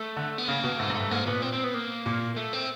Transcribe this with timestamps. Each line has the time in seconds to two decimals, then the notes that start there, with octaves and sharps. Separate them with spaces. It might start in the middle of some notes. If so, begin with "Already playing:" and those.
Already playing: A3
0.16 D3
0.38 B3
0.48 C#3 A#3
0.64 B2
0.79 G#2 A3
0.90 G#2
0.95 A3
1.00 G2
1.11 G#2 A#3
1.26 A#2 B3
1.42 C4
1.53 C4
1.64 B3
1.74 A#3
2.06 A#2
2.36 A3
2.53 C4